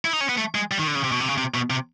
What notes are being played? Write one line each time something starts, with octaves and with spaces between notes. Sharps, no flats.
E4
D#4
C#4
B3
A3
G#3
G3
D#3
D3
C#3
C3
B2
C3
C#3
C3
B2
C3